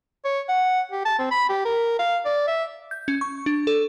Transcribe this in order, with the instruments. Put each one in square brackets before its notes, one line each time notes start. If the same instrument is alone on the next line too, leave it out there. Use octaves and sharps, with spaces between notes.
[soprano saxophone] C#5
F#5
G4
A5
C4
B5
G4
A#4
F5
D5
E5
[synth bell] G6
C#4
C#6
D4
A4